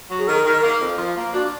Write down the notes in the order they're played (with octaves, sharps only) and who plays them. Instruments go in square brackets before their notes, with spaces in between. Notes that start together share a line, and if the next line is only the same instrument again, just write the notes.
[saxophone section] F#3
[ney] G#4
[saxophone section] D#3 [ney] A#4
[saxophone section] D#3
A#3
F2
F3
A#3
[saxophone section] D4 [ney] F#4